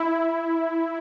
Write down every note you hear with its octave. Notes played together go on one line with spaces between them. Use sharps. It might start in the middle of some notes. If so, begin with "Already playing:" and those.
Already playing: E4